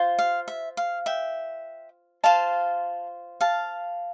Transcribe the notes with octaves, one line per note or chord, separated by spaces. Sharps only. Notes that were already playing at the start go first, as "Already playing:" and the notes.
Already playing: F4 C5
F5
E5
F5
E5 G5
F4 C5 F5 A5
F5 A5